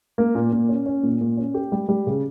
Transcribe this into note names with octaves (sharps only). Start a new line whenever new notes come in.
A#3
A#2
A#2
C#4
C#4
A#2
A#2
C#4
G4
G3
G3
C#3